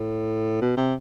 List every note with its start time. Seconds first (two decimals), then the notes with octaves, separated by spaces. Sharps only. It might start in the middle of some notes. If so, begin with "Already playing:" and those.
Already playing: A2
0.61 B2
0.77 C3